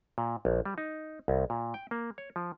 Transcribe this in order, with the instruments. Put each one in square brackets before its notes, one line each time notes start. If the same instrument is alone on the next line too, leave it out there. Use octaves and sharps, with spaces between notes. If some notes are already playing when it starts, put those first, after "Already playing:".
[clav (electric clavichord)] A#2
A#1
G3
D#4
C2
A#2
G5
A#3
C#5
F3